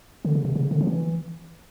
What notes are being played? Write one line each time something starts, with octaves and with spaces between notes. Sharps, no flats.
D3
C#3
C3
C#3
D3
F3
E3